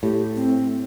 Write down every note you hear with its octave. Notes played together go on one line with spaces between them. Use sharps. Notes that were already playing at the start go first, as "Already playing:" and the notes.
A2 G4
C4